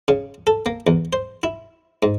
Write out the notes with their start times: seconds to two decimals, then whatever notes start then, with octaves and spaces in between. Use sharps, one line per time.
0.08 C#3
0.47 A4
0.66 A#3
0.87 E2
1.13 C5
1.43 E4
2.03 G#2